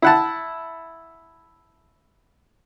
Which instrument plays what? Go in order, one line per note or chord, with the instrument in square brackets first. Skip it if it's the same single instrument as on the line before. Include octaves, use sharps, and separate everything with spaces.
[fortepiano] E4 F#5 A5